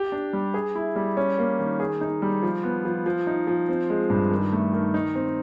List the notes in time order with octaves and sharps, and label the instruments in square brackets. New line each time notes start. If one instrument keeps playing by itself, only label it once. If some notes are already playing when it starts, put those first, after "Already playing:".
Already playing: [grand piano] G4
D4
G3
G#4
E4
G3
C#4
A#3
D#3
G#4
D#4
G3
F3
B3
F3
F3
D#4
F3
C4
G#3
G2
D#3
A3
D#3
D#4
C4